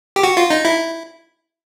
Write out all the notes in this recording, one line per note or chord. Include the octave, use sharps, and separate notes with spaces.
G4
F#4
F4
D#4
E4